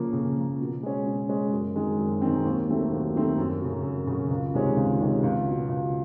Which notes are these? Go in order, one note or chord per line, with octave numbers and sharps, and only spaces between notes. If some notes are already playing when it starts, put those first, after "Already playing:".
Already playing: C#3 F3 A#3
C#3
F3 A#3
B2
G#3 C#4
B2
G#3 C#4
F#2
D#3 G#3 C4
F#2
D#3 G#3 C4
D#2
D#3 F#3 A3 C4
D#2
D#3 F#3 A3 C4
F#2
C#3 F#3
F#2
C#3 F#3
C#2
C3 D#3 G#3 C#4
C#2
C3 D#3 G#3 C#4
C#2
B2 F#3
C#2